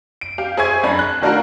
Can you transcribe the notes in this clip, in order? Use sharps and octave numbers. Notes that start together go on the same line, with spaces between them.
D7
G4 F5
G#4 C5 E5 G#5 C#6 G#6
F#2 D4 B5
F#6
D#3 A3 D4 F4 F#4 A#4